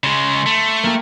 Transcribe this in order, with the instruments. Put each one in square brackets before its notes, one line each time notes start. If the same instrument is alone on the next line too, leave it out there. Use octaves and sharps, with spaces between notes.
[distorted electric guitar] C#3 G#3 [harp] C6
[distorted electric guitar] A3
[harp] A#3 G4